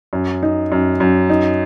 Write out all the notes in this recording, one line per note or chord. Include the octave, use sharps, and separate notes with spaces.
F#2
D#4
F#2
F#2
D#4